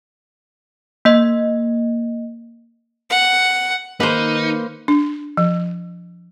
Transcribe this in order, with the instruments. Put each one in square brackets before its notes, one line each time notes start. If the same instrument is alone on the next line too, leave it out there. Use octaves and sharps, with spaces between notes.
[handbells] A#3 D#5
[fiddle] F#5
[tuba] D#3 [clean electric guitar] A#3 [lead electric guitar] D#4 [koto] B4 C5
[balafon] D4
F3